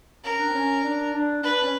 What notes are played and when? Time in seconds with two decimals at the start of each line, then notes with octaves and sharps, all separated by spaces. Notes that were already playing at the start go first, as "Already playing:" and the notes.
0.24 C#4 A#4
0.39 D4
0.47 C4
0.54 C#4
0.84 D4
1.14 D4
1.43 D4 B4
1.54 D4
1.64 C#4